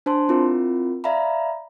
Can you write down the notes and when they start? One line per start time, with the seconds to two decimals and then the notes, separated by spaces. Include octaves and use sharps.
0.06 D4 C5 A5 C6
0.29 C4 E4 F4 A#4
1.04 D5 E5 F5 A#5 B5